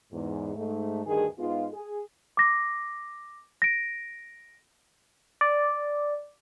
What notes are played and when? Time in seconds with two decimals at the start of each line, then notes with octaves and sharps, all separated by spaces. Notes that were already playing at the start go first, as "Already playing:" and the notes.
0.12 E2 G#2
0.56 G#2 A3
1.07 D2 G2 D#3 G#4
1.39 G#2 G#3 B3 D#4 F4
1.73 G#4
2.37 D6 A#6
3.62 A#6 D7
5.41 D5